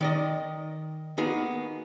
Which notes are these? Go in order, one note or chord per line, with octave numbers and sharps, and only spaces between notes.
D#3 D5 D#5
A#3 B3 D#4 F#4 G#4